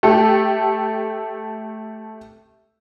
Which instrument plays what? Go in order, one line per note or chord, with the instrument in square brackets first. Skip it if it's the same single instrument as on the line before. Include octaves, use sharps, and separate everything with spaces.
[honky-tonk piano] A3 G4 A4